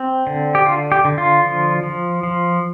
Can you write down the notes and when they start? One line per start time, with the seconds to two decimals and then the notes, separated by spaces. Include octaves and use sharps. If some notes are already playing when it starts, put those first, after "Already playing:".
Already playing: C4
0.27 D3
0.55 G4
0.66 D3 F4
0.92 G4
1.05 D3
1.18 F4
1.45 F3
1.83 F3
2.23 F3